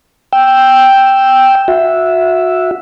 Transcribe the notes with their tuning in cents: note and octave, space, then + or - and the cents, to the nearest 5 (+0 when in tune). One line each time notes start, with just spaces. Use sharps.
G5 +0 E6 +0
F#4 -25 E5 +0